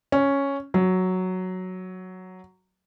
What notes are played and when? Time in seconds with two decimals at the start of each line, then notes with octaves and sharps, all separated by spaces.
0.12 C#4
0.74 F#3